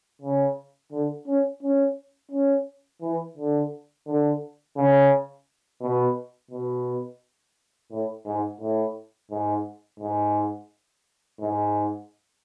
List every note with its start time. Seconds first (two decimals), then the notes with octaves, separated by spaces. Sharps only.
0.22 C#3
0.92 D3
1.27 C#4
1.62 C#4
2.31 C#4
3.02 E3
3.37 D3
4.07 D3
4.77 C#3
5.81 B2
6.51 B2
7.91 A2
8.26 G#2
8.61 A2
9.31 G#2
10.00 G#2
11.41 G#2